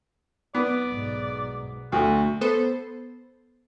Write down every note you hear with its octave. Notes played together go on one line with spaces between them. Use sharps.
B3 D5
B1 G#2
D2 A3 F#4
B3 A4 C5